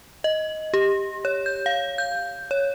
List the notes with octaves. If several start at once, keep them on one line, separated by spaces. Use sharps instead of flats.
D#5
G4
C#5
G6
F5
G6
C#5